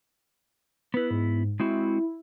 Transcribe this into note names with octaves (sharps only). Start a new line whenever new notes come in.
B3 E4 B4
G#2
G#3 C4 E4 F#4